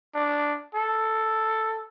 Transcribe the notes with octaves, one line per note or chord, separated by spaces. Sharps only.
D4
A4